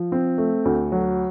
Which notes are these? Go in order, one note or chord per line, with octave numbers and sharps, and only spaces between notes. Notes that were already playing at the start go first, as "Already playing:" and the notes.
Already playing: F3
C4
A3
D2
F#3